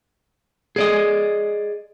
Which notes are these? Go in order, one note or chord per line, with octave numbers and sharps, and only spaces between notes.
G#4 D5 D#5